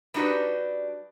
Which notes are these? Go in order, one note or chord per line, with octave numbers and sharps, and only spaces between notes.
G3 D4 D#4 F#4 G4 B4